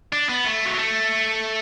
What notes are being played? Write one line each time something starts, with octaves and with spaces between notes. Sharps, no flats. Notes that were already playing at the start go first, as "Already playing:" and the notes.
D4
B3
A3
F#3
A3